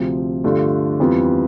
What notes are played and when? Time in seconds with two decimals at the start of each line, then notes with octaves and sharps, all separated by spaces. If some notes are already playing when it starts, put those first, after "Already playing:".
Already playing: D2 C3 F3
0.44 G2 D3 A3 D4 F4
1.00 F2 E3 G3 B3 F4